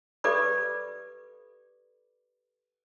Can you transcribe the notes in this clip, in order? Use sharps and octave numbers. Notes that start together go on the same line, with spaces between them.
G4 A4 B4 D5 B5 D6